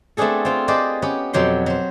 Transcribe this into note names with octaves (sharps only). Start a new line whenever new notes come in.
A3 B3 C4 D4 G#4 A4
C4 F4
G4 G#4 B4 C5 D5 D#5
B3 C#4 G4 B4
F2 B2 F#3 G4 G5 C6
F#3 C5